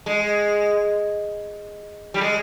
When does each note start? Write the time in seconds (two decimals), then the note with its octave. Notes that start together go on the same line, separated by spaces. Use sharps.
0.06 G#3
2.14 G3
2.21 G#3